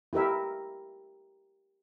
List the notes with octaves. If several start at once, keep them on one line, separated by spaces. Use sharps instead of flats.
E4 G4 A#4 E5